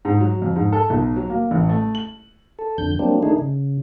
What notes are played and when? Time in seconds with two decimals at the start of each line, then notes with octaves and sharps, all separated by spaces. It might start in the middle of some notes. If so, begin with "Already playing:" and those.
0.05 G#2
0.20 F#3
0.42 F2
0.56 G#2
0.73 A4
0.90 B1
1.16 F#3
1.30 A#3
1.51 A1
1.69 A3
1.95 F#7
2.59 A4
2.78 F2 D3 G6
2.99 F#3 G3 A#3 C4 D4
3.23 D#3 A3 D4 D#4 G#4
3.38 C#3